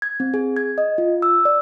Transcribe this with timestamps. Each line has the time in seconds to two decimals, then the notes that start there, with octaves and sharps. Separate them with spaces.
0.02 G#6
0.20 C4
0.34 G#4
0.57 G#6
0.78 D#5
0.98 F4
1.22 E6
1.45 D5